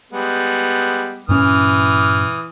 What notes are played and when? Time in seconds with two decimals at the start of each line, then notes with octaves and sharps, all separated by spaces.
0.12 G3 G#3 B3
1.29 G2 A#2 E3 C#4 D#6 F6